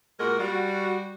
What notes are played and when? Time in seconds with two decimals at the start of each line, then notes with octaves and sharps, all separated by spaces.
0.20 A#2 G#3 F#4 A#4
0.40 G3 F#4